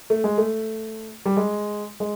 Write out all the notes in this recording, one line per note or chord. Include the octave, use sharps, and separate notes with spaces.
A3
G#3
A3
G3
G#3
G#3